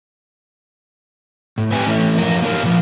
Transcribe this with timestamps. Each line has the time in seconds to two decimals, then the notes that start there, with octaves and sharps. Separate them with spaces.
1.58 A2
1.72 C4 G4 B4 E5 G#5
1.87 E3 A3 C#4
2.18 F#2 F3 A#4
2.42 A#3 D4 D#4 A4 A#4
2.63 A#2 F3